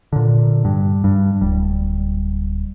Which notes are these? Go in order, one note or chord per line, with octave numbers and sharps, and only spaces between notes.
A#2 D3
G2
G2
D1 G3